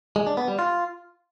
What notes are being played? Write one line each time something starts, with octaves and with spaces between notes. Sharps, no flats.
G#3
D4
B3
G3
F4